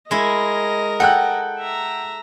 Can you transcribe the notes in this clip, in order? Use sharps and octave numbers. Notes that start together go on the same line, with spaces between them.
G#3 E4 A#4 D#5
A4 F#5 G5 F#6
E5 A#5